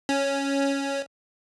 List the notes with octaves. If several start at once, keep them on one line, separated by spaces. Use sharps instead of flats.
C#4